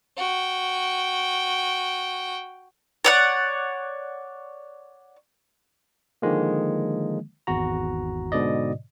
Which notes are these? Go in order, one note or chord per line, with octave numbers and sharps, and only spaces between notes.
F#4 G5
C#5 D5 F#5
D3 D#3 F3 G#3 A#3
G#1 E2 F#4 A#5
G#2 B2 D3 D5 D#5